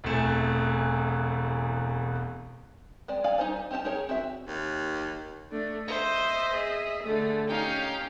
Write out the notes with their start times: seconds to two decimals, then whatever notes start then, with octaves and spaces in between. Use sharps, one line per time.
0.04 E1 E2 C3 A3 E7
3.08 G#3 C4 D5
3.24 D5 F5 G#5
3.38 G3 D#4 A4 C5 G#5
3.71 C4 C#4 G4 E5 A5
3.85 D#4 G4 G#4 A#4 C#5
4.09 C4 F#4 E5
4.47 D#2
5.51 A3 D4
5.88 C5 D#5 E5
6.53 G#4
7.04 D3 A3
7.48 C#4 D#4 G4 F5